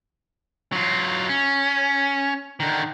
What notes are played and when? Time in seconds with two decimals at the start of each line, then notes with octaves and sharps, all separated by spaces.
0.72 F#3 F4
1.29 C#4
2.60 D3 D#3